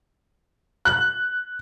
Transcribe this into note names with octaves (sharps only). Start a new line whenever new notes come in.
F#6